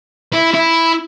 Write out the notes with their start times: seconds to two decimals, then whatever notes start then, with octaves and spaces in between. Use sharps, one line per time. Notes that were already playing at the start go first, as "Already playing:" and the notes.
0.33 E4
0.54 E4